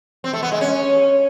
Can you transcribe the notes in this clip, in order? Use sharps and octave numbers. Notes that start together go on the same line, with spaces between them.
C4
A3
B3
G#3
C#4